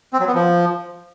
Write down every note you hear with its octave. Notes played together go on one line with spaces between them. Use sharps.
C4
F#3
B3
F3